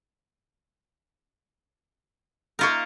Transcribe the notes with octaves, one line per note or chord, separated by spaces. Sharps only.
A#3 D#4 F4 A#4 E5 C#6